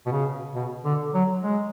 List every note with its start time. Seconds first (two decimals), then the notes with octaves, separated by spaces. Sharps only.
0.06 B2
0.12 C#3
0.56 B2
0.85 D3
1.14 F#3
1.43 G#3